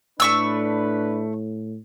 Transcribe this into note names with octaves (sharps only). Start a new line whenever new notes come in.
A2 A3 D4 B4 C#6 E6